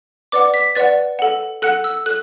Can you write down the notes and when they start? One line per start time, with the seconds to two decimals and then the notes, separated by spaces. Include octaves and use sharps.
0.32 B4 D5 F#5 D6
0.54 B6
0.75 B4 D5 F#5 A6
1.19 A4 F#5
1.62 A4 F#5 F#6
1.84 E6
2.06 A4 F#6